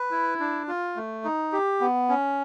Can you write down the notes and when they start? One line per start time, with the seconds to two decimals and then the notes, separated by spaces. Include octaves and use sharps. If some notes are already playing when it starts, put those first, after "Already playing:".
Already playing: B4
0.11 E4
0.40 D4
0.67 F4
0.96 A3
1.24 D#4
1.52 G4
1.81 B3
2.09 C#4